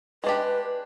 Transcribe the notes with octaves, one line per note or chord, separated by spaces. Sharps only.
G#3 D4 G4 B4